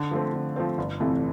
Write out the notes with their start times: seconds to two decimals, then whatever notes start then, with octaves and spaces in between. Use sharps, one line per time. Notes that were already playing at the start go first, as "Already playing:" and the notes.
Already playing: D3
0.11 F3 A3 C4
0.34 D3
0.56 F3 A3 C4
0.78 G1
1.00 F2 C3 E3 A3